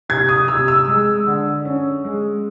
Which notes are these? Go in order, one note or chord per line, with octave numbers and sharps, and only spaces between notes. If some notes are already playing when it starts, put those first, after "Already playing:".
C3 G#6
D#6
C3 E6
E6
G#3
D3
C#4
G#3